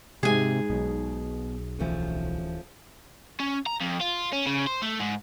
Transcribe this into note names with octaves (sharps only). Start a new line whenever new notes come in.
G#2 C3 G#3 G#4 G#5
B1 B2
D1 E3 F3 A3 C#4
C#4
A#5
F2
F4
C#4
C#3
C5
A3
G#2